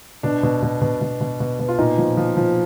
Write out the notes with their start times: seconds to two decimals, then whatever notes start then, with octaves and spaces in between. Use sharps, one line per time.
0.23 B2 D4
0.43 B2
0.62 B2
0.82 B2
1.01 B2
1.21 B2
1.40 B2
1.60 B2
1.68 F4
1.78 A#2 D#4
1.98 F3
2.17 F3
2.37 F3